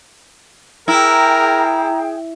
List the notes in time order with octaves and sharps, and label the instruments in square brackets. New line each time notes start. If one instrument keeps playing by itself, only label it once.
[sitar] E4 [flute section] G#4 G5 [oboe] A#4 [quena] A#5